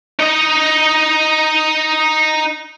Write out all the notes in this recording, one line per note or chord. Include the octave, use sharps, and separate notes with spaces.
D#4 D#5